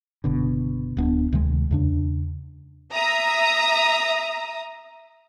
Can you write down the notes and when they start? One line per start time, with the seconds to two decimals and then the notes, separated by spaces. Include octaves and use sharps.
0.24 F#1 B2 D3
0.97 D1 B3 D4
1.33 D2 C3 D#3 G#3
1.71 E2 C#3 D4
2.93 E5 A#5 D#6